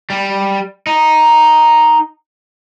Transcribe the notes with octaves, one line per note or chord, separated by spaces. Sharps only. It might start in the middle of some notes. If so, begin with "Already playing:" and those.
G3
D#4